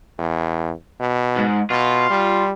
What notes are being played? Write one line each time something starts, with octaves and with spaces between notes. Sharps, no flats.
E2
B2
G#2
B2 F4
G3